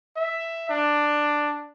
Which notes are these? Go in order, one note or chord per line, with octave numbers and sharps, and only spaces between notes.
E5
D4